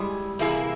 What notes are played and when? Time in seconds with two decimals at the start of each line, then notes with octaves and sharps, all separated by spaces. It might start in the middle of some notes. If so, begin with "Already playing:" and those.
Already playing: G3 G#3 E4 G#4
0.39 C3 E3 A#3 E4 G#4